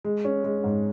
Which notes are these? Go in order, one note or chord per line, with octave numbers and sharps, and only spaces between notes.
G#3
C#4
G#3
G#2